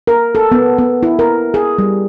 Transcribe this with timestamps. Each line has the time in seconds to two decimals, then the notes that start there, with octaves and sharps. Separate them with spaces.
0.07 A#4
0.35 A4
0.52 B3
0.78 B3
1.03 E4
1.19 A#4
1.54 G#4
1.78 G3